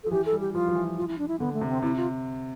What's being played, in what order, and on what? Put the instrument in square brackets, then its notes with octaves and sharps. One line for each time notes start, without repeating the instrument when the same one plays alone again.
[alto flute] A4
[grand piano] F3
[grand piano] E3 [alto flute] G4
[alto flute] A4
[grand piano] G3
[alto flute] G4
[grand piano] F3 [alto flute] F4
[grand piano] F3
E3
[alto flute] F4
E4
D4
E4
[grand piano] D3 [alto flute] B3
[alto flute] A3
[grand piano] C3
[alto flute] C4
[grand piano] C3 [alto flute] E4
[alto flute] F4